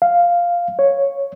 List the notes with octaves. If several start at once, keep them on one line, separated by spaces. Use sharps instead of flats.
F5
C#5